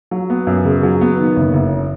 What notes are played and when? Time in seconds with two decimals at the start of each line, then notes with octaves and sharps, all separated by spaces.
0.11 F#3
0.30 B3
0.47 F#2
0.65 C#3
0.83 F#3
1.01 B3
1.18 D#3
1.36 F#1
1.54 F#1